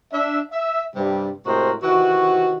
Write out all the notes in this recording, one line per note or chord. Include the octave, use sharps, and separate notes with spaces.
D4 E5
E5
G2 C3 G3
A2 C3 G#3 F#4 A#4 C5
C3 D#3 E3 F#4